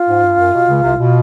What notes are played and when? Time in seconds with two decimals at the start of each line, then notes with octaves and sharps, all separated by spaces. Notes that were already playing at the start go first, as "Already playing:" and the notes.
Already playing: F4
0.09 G#2
0.24 G2
0.38 F#2
0.54 B2
0.68 C#2 C#3
0.82 C2 C3
0.98 B2